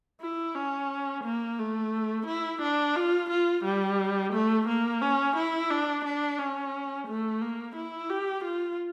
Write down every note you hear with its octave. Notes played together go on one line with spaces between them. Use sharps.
E4
C#4
A#3
A3
E4
D4
F4
F4
G3
A3
A#3
C#4
E4
D4
D4
C#4
A3
A#3
E4
G4
F4